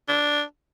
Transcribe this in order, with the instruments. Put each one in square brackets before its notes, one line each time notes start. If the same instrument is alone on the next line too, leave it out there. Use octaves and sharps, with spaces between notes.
[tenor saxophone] D4